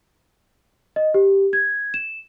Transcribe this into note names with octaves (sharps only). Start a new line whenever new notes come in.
D#5
G4
G#6
E7